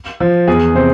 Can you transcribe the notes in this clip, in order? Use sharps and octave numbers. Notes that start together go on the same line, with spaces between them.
F3
E2 G#4
C3 C5